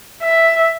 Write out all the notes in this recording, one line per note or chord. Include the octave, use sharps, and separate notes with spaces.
E5